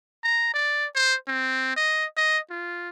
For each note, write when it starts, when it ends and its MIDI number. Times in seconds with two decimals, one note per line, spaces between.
0.24 0.53 82
0.54 0.86 74
0.95 1.15 72
1.28 1.74 60
1.76 2.05 75
2.17 2.39 75
2.51 2.90 65